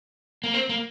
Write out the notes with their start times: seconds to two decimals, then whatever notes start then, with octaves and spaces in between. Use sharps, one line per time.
0.44 A#3
0.54 C4
0.69 A#3